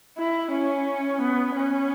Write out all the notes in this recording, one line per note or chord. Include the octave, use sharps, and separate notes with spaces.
E4
C#4
B3
C#4